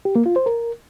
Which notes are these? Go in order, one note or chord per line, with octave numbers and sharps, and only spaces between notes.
G4
A#3
F4
C5
A#4